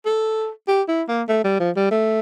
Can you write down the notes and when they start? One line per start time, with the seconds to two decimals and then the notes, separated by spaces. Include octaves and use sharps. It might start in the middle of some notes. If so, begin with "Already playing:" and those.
0.06 A4
0.68 G4
0.88 E4
1.08 A#3
1.28 A3
1.44 G3
1.60 F3
1.76 G3
1.91 A3